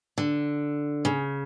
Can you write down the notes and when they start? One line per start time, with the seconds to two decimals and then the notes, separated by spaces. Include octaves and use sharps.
0.18 D3
1.05 C#3